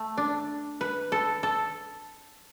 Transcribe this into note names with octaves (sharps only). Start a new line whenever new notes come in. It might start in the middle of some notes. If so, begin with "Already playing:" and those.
Already playing: A3
D4
B4
A4
A4